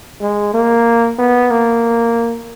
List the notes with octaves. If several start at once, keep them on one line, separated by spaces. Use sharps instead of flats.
G#3
A#3
B3
A#3